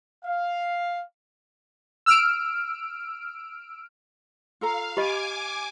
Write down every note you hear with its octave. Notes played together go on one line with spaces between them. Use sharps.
F5
E6 F6 D7
F4 A4 F5 A#5
G4 D#5 G#5 B5 D6